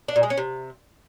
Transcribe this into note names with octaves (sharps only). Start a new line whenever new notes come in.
D4
A#2
G#3
C#4
C3